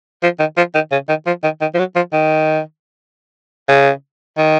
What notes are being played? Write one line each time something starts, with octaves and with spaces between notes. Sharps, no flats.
F3
D#3
F3
D#3
C#3
D#3
F3
D#3
D#3
F3
F#3
F3
D#3
C#3
D#3